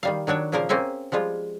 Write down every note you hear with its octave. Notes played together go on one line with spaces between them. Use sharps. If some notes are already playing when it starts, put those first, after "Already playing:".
D#3 G3 F5
D#3 F#3 D4 C#5
A#2 C#3 F3 A#3 A#4 F5
A#3 C4 C#4 C5 E5
F3 G3 G#3 F4